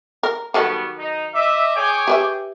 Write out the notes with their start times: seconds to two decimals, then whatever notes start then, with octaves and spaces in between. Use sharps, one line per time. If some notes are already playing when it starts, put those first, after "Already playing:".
0.23 A#4
0.54 D#3 F#3 G3 B3 A4 C#6
0.97 D#4
1.34 D#5 E5 D6
1.76 G#4 C#5 G5
2.07 G4 B4 E5